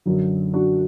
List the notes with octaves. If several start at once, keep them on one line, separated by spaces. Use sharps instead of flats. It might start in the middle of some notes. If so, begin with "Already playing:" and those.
F#2 D3 F#3
D4 F#4